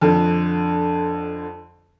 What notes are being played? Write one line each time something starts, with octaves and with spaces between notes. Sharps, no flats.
F2 D3